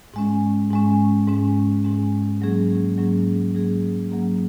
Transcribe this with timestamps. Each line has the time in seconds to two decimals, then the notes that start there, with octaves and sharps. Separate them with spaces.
0.14 G#2 G#3 C#4
0.71 G#2 G#3 C#4
1.27 G#2 G#3 C#4
1.84 G#2 G#3 C#4
2.41 G#2 F#3 A#3 C#4 G#4
2.98 G#2 F#3 A#3 C#4 G#4
3.54 G#2 F#3 A#3 C#4 G#4
4.11 G#2 F#3 A#3 C#4 G#4